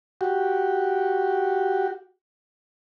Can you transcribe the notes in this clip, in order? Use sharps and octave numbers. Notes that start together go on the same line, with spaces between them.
F#4 G4